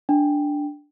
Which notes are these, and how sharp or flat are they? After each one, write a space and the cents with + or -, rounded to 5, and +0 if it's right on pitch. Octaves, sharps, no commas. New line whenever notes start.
D4 +0 G5 +0